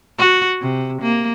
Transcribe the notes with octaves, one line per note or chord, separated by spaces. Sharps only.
F#4
C3
A#3